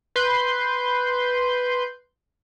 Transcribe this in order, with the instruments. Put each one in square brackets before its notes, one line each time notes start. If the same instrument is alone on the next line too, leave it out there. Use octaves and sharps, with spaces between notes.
[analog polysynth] B4 C6 G6